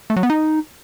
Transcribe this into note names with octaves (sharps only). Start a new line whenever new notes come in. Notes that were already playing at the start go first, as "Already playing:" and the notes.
A3
F#3
B3
D#4